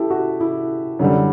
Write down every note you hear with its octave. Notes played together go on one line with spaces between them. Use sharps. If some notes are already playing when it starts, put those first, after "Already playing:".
Already playing: E4 G4 A4
F#4
E4
F#2 D3 G3